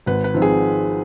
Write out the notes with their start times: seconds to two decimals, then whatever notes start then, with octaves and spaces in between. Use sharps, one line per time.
0.06 G#1 B4
0.24 B4
0.34 F3 C4 D#4
0.42 G#4